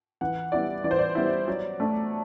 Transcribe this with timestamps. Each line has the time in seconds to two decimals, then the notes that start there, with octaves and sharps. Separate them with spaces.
0.21 E3 F#5
0.52 G3 B3 E4 D5
0.84 E3 D5
0.91 C5
0.99 D5
1.15 G3 B3 E4
1.48 F#3
1.80 A3 D4